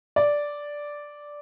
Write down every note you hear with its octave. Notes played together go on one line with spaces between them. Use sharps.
D5